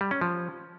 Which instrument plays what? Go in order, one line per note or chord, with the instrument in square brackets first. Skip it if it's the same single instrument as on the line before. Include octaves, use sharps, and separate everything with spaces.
[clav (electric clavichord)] G3
C#4
F3